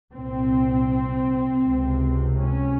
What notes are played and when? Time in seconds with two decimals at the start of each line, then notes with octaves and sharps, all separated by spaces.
0.12 C2 A#2 C4
1.63 C#2 C3
2.37 C#4